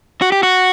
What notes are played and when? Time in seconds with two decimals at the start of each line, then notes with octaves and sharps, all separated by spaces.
0.22 F#4
0.32 G4
0.43 F#4